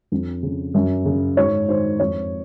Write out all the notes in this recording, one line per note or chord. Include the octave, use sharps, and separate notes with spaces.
F2
C#3
F#2
C#3
G#2 C#5
D#3 C5
F2 C#5